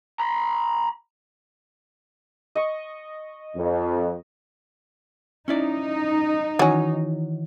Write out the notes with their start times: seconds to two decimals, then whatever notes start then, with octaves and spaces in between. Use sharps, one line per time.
0.20 A#5 B5
2.55 D#5 C#6
3.55 F2
5.48 C#4 D#4 E4 D5
6.59 D#3 E3 F#3 C#4